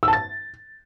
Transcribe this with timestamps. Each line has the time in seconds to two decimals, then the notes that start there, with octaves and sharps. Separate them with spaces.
0.03 E6
0.08 A5
0.13 A6